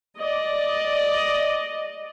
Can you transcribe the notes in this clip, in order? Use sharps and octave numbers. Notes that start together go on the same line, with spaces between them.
D5 D#5